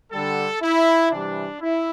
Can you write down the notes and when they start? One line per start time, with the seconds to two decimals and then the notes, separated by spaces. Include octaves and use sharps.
0.13 D3 G3 A4
0.62 E4
1.12 C3 E3 G3 D4
1.61 E4